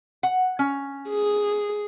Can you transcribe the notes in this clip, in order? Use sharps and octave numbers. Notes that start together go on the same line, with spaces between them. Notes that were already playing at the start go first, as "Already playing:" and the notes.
F#5
C#4
G#4